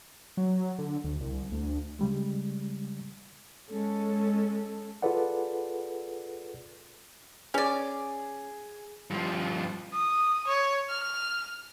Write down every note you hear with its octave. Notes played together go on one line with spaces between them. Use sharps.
F#3
D3
D2
C2
D2
C#3 G3 G#3
G#3 C#4 A4
F4 G#4 A4 B4 D5 F#5
C#4 G#4 D5
G2 F3
D#6
C#5
F6